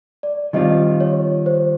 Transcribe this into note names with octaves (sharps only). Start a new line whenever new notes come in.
D5
D#3 G3 C4 F4 D#5
C#5
C5